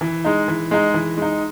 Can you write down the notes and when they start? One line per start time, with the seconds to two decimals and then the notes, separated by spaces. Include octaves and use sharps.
0.01 E3
0.25 G#3 D#4
0.48 E3
0.71 G#3 D#4
0.94 E3
1.17 G#3 D#4